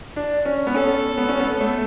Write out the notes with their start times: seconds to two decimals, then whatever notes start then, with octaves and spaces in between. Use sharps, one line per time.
0.16 D4
0.45 C#4
0.67 B3
0.74 C#4 A4
1.18 B3
1.29 C#4
1.40 B3
1.61 A3